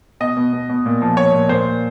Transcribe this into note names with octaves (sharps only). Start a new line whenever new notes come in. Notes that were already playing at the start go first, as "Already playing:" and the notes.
B2 D#5
B2
B2
B2
A#2
F3
F3 C#5
A#2
A#2 C5
A#2